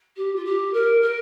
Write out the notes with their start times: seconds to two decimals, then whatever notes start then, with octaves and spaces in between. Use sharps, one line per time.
0.16 G4
0.35 F4
0.45 G4
0.73 A#4
1.01 A#4